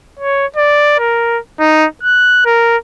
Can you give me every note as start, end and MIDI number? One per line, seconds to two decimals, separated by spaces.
0.19 0.46 73
0.56 0.94 74
0.99 1.39 70
1.60 1.86 63
2.03 2.41 90
2.46 2.77 70